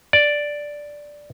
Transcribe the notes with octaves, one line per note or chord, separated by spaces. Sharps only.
D5